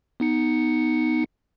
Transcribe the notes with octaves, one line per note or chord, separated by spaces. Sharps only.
B3 D#4 C#7